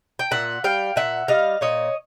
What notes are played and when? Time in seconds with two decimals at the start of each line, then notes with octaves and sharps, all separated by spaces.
0.19 G5
0.31 A#2 E5 F#5
0.64 G3 F5 G5
0.96 A#2 E5 F#5
1.28 G3 D#5 F5
1.61 A#2 C#5 D#5